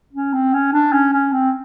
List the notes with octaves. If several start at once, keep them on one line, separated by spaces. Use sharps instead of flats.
C#4
C4
C#4
D4
C#4
C#4
C4